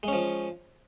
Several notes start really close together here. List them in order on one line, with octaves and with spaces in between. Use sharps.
G#3 C#4 F3